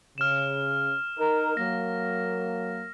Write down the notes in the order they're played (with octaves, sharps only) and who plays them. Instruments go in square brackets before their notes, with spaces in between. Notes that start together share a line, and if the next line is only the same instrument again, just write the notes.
[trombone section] C#3 [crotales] F6 E7
[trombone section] D#4 A#4
[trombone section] F#3 A#3 [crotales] A#6